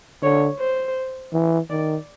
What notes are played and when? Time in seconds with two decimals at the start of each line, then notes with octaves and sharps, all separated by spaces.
0.23 D3 C#5
0.59 C5
1.33 E3
1.70 D#3 D5